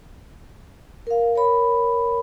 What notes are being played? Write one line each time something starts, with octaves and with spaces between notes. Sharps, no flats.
A#4 F5
A#4 C#5 B5